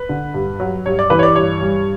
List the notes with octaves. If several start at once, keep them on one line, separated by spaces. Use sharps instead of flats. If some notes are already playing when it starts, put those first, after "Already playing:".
Already playing: B4
D3
G2
F#3
G2 C#5
D5
E3 B4
C#5
D5
G2 C#5
G3